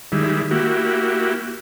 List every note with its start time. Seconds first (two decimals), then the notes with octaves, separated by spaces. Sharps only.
0.12 D#3 G3 G#3 E4
0.51 A#3 E4 F#4 G4